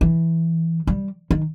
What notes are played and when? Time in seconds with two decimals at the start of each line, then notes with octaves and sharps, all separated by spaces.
0.01 E3
0.87 G3
1.31 D#3